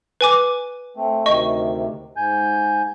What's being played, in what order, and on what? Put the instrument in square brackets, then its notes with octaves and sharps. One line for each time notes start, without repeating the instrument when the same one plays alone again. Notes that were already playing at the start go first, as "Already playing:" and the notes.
[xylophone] B4 G#5 D6
[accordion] A3 C4
[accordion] D2 C3 D#3 [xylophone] D#5 C#6
[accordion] G#2 G#5 G6